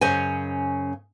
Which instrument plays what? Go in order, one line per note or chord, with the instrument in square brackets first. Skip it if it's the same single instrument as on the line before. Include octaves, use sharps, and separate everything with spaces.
[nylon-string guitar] F#2 C#3 C#4 C5 D#5 G#5